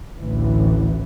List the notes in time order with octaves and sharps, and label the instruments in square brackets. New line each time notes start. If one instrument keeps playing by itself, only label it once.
[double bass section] A1 D2 E3